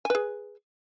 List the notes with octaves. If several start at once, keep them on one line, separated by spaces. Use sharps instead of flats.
G#4 B4 G#5